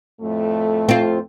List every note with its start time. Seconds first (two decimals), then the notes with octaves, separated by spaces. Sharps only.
0.20 F2 A2 A3
0.89 C4 F4